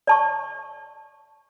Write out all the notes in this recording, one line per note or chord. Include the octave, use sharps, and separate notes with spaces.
D5 A5 C#6